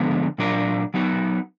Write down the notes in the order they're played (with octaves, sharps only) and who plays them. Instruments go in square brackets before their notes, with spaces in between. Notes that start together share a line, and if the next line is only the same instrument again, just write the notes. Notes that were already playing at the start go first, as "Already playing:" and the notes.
Already playing: [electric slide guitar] D3 F3 G#3 B3
A#2 F#3 D4 F4 A#4
F#3 B3 D#4 F#4 A#4